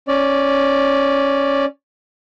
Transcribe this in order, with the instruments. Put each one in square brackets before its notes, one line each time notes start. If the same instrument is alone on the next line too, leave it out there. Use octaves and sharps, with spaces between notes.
[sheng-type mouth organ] C#4 D5